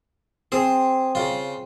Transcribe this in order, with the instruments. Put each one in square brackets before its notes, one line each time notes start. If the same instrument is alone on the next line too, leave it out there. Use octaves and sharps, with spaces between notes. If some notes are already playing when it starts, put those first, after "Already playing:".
[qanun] C4 [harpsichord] G#4
[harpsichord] C#3 F4